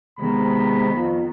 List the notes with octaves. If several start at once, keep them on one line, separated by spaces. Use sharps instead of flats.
C3 D#3 G#3 B3 B5
F2